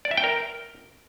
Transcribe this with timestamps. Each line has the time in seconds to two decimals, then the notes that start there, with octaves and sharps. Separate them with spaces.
0.05 D5
0.11 E5
0.17 G5
0.24 A#4